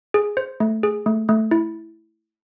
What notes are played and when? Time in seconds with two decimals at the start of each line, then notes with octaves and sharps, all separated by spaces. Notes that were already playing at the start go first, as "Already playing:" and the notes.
0.14 G#4
0.37 C5
0.60 A3
0.83 G#4
1.06 A3
1.29 A3
1.51 E4